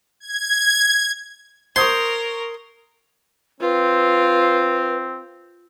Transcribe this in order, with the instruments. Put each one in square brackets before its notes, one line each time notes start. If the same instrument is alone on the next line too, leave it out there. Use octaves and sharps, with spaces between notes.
[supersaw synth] G#6
[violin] A#4 [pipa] C5 [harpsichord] C6 [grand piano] C#6 D#6 G#6
[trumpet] C4 [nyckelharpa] F4 [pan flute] B4